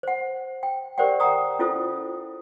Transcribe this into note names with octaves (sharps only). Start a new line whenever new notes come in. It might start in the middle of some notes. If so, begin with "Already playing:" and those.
C5 F#5
G5
G4 A#4 C5 D5 F#5 G5
F#5 G5 A#5 D#6
C#4 E4 F4 A4 C5 D#6